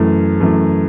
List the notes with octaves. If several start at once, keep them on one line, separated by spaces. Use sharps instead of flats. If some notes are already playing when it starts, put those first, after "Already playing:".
Already playing: F#2 E3 A3
F#2 E3 A3